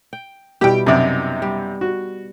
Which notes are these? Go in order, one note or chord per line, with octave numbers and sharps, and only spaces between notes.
G5
B2 G3 E4 G4 G5
F#2 C3 D#4 D5
G3
F#4